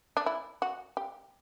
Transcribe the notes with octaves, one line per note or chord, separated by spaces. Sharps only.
D4
E4
F#4
G4